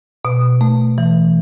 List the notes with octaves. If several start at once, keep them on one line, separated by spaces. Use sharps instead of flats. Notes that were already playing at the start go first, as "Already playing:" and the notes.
B2
A3
E3